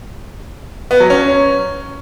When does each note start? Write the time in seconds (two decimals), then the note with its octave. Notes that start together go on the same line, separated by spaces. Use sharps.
0.91 B3
1.00 F#3
1.10 C#4